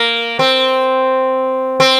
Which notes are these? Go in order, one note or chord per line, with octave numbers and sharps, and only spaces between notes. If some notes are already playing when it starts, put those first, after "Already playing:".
Already playing: A#3
C4
C4